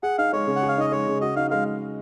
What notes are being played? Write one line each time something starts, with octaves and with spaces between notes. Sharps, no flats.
G#4 F#5
D#4 F5
G#3 C#5
C#3
F#5
G#4
F5
D#4 D#5
G#3 C#5
C#3
F#4 D#5
D#4 F5
G#3 F5